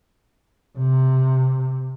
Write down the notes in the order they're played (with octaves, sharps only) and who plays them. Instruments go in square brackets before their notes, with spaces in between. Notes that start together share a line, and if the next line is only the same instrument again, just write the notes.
[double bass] C3